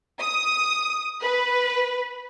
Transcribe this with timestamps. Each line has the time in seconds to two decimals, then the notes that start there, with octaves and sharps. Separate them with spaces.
0.20 D#6
1.21 B4